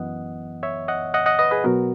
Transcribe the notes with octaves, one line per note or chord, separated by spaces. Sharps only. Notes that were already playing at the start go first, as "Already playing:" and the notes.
Already playing: F#2 E3 B3 D#5 F#5
C#5 E5
D#5 F#5
D#5 F#5
D#5 F#5
B4 D#5
G#4 B4
B2 F#3 B3 F#4 A#4